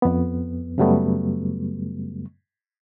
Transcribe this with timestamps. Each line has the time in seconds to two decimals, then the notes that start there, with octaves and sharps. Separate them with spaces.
0.02 F2 B3
0.78 F#2 C#3 F#3 G3 A3 B3